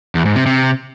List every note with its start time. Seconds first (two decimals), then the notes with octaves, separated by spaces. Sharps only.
0.15 E2
0.25 G#2
0.36 C3
0.46 C3